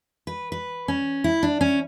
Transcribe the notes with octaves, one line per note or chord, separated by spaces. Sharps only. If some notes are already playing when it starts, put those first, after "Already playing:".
B4
B4
C#4
E4
D4
C#4